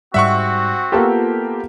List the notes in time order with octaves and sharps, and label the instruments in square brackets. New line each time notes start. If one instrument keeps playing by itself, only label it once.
[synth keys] G#2 G3 [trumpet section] C4 F#4 [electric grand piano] E5 F#5 C#6
[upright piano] A#3 B3 G4 [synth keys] F4 A4 A5